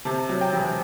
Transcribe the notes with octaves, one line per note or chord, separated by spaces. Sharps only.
C3 A5
F#3
G5
E1